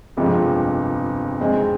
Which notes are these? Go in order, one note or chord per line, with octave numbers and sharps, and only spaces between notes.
G1 F2 C3 F3 G#3
E2 B2 G#3 C4 D#4